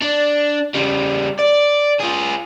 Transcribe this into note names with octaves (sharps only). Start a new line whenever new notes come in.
D4
C#3 G3
D5
F4 G#4